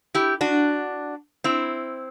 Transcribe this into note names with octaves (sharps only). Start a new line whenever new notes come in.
E4 G4
D4 F#4
C4 E4